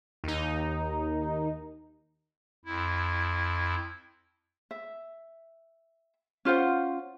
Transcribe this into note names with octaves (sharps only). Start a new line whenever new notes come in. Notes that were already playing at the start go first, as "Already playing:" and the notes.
D#2 D#4
F2 E4
E5
C#4 F4 C5 F#5